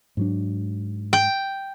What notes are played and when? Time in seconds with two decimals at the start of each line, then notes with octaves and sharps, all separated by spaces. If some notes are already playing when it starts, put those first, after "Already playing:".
0.17 G#2 F#3 D4
1.13 G5